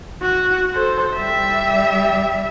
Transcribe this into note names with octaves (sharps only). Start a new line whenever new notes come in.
F#4
A4 C5
G3 E5